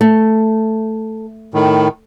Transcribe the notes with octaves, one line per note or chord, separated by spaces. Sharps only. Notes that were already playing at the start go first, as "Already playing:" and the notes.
A3
A2 D#3